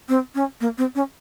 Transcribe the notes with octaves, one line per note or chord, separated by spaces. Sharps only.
C4
C#4
A#3
C4
C#4